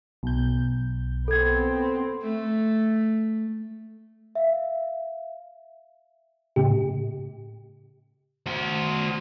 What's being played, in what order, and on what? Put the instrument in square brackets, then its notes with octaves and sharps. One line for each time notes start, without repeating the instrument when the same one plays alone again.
[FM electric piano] B1 G6
[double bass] B3 C4 [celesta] A4 G#6
[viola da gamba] A3
[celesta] E5 F5
[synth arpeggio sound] A2 C#3 G4
[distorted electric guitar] F#4 C5